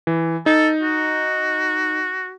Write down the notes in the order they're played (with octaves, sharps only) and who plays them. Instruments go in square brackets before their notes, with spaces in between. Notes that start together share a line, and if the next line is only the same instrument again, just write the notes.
[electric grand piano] E3
[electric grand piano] D#4 [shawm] A4
[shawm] F#4